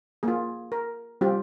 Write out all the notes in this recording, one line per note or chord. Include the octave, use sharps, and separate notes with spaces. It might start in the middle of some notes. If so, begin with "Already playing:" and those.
A#3 F4 G#4
A#4
G3 C4 F4 G4